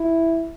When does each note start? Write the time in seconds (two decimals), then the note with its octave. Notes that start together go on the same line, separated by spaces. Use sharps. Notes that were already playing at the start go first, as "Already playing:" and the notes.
Already playing: E4